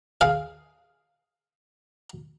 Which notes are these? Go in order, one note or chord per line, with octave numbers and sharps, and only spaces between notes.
G#4 F5